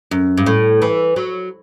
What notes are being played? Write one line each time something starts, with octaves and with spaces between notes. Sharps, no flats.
F#2
G2
A2
E3
F#3